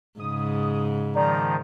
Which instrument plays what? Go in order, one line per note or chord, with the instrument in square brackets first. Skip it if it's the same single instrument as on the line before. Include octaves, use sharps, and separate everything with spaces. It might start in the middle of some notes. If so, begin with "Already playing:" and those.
[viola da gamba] G#2 C#3 [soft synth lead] D#6
[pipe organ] D#3 F3 [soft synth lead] D5 [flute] A#5